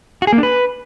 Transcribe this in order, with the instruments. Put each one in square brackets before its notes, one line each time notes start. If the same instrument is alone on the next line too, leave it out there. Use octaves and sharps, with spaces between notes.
[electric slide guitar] F#4
G#4
A#3
D4
B4